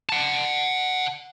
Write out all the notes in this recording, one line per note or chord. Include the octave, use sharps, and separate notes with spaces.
F#5 A5